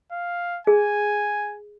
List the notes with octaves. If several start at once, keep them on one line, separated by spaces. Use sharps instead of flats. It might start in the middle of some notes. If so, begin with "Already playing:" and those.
F5
G#4 G#5